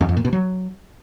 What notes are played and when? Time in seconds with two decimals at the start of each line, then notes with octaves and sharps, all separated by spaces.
0.01 E2
0.09 F2
0.17 A#2
0.25 B2
0.33 F#3